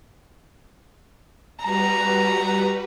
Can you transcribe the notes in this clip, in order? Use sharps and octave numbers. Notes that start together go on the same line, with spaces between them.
G3 F#4 B4 A#5